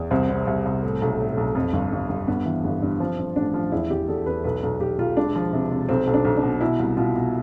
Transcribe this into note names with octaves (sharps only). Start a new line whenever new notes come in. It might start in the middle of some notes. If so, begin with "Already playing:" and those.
Already playing: E2
C2 C4
C3
C2
C2
A2
B1
A2
B1
F2
G1
G1
G1
G2 B3
E3
G1
G2
F3 C4
G2
A1 D4
F3
E2 E4
E2 G4
E2 A4
E2 B4
B1 B4
B1
B1 G4
B1 F4
E1 D4
F3
C3
C3
B1 C4
B1
D4
B1
D4
B2
B2 E4
C2
B2 F4
B2